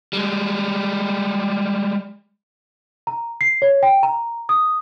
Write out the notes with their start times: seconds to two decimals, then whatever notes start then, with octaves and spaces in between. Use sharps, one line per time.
0.13 G3 G#3
3.07 A#5
3.41 C7
3.62 C#5
3.83 G5
4.03 A#5
4.49 D#6